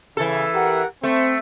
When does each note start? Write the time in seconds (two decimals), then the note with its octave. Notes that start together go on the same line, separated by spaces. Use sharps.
0.17 C#3 E3 A4
0.55 G4 A#4 F#5
1.03 A3 C4